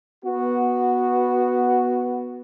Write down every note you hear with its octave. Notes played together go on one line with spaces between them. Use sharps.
B3 F#4